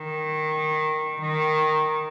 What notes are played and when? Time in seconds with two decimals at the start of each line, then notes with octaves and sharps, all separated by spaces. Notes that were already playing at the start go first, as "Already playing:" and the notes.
Already playing: D#3
1.21 D#3